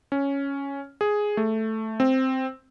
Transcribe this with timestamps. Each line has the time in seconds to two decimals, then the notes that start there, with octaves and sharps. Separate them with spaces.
0.12 C#4
1.01 G#4
1.37 A3
2.00 C4